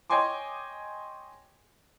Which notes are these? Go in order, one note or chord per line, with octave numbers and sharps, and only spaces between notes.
C#5 D#5 G5 G#5 C6 D6